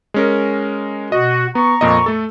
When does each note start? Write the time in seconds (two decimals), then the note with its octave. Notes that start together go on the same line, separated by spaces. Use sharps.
0.14 G#3 C#4 A#4
1.12 B2 F#4 D#5
1.55 B3 A#5 C#6
1.81 F2 A#2 D#5
2.06 A3 A4